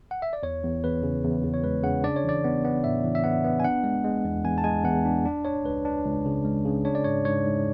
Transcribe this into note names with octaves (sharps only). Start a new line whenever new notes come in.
F#5
E5
D5
E2 C#5
E2
E2 B4
C#3
E2
E2
C#5
G#3 B4
C#3 F#5
D4 D5
C#5
E3 D5
B3
B3
A2 E5
E3
E5
B3 F#5
B3
G#5
D4 F#5
G#3
G#3
E2
E2 G#5
A5
G#3 G#5
E2 F#5
D4
D4
D4 C#5
C#2 B4
D4
C#2
C#3
G#3
C#3
D4 C#5
D5
G#2 C#5
G#2 C#5
G#2